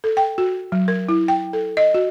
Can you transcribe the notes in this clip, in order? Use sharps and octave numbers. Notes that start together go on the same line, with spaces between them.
A4
G5
F#4
F#3
A#4
E4
G5
A4
D#5
F#4